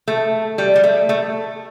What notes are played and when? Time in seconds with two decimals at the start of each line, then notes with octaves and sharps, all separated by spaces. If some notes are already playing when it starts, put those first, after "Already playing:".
0.08 A3
0.58 G3
0.76 G3
0.84 A3
1.09 A3